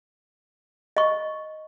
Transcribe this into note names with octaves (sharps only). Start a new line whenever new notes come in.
D#5 C#6